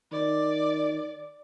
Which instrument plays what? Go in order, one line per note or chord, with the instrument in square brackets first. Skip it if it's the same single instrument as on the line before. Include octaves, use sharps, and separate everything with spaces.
[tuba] D#3 [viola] D5